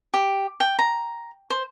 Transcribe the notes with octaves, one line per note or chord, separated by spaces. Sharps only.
G4
G5
A#5
C5